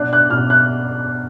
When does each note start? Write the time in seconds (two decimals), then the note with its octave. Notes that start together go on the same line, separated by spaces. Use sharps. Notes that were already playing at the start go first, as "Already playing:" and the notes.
Already playing: B2 D4 F#6
0.13 F#6
0.30 B2 F6
0.50 F#6